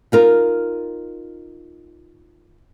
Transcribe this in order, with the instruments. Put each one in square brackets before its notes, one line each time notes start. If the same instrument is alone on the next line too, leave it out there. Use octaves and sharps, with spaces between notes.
[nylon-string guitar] D#4 F4 A#4